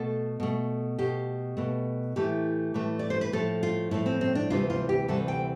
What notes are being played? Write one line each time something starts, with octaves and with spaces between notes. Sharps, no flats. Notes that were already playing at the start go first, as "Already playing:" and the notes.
Already playing: B2 A3 A4
B2 A3
B2 A3 G4
B2 A3
A2 E3 A3 G4
A2 E3 A3
D5
C5
B4
A2 F3 A3 A4
F4
A2 F3 A3 E4
C4
C4
D4
D2 C3 E3 G3 F4
F4
G4
D2 C3 E3 G3 A4
G5